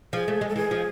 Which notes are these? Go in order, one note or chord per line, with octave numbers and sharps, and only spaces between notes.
F3 G#4
A3
G#3
A4
E3 G#4
F3